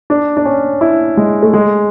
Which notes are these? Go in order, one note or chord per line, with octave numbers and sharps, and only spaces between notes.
D4
D4
C#4
E4
G#3
A3
G#3